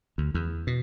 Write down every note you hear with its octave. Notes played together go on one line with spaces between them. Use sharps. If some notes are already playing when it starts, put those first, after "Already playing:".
D2
E2
B2